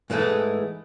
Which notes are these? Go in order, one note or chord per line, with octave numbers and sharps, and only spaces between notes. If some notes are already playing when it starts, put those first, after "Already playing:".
G#2 E3 G#3 A3 E4